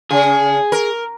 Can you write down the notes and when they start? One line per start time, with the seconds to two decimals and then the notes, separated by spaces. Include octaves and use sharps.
0.11 C#3 G#4
0.72 A#4